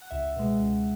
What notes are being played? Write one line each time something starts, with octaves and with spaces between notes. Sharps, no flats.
F#5
C#2 E5
B2 G#3
C#2